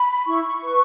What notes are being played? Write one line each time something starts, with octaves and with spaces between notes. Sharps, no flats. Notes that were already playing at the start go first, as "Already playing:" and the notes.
Already playing: B5
E4 C#6
B4